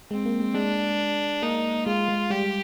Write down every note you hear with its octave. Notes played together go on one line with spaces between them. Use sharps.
G#3 C4
A#3
G#3
G#3 D4
A#3 D#4
G#3 F4
G#3
G3 G4